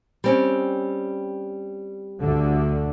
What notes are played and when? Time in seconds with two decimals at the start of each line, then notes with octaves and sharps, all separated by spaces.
0.24 G3 C4 C#4
2.20 D2 D3